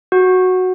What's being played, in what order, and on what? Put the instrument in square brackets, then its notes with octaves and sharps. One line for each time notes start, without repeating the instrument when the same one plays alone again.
[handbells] F#4